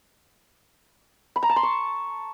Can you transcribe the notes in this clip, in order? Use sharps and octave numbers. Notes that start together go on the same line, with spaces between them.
B5
A#5
A5
C6
C#6